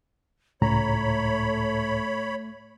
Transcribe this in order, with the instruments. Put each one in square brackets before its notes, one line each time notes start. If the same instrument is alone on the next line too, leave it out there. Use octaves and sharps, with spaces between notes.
[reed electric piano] C#2 A2 A#5 [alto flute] A3 [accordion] C#5 B5